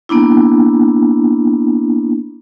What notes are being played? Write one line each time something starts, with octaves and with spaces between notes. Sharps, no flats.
A#3 B3 D4 E4